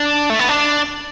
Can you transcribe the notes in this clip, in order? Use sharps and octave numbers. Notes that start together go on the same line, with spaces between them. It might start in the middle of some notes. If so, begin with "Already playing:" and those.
Already playing: D4
A3
B3
D4